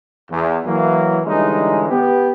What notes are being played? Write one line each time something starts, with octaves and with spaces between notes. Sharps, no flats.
E2
E3 F#3 A#3
D3 E3 G3 G#3 C#4 D#4
B3 G4